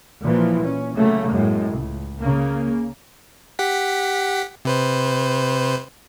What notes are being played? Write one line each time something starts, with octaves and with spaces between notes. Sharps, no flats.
A#2 E3 F3
C#4
C#3 F#3 A3 A#3
F#2 A2 G#3
C#2
C#3 A#3
G4 F#5 B6
C3 B4 C5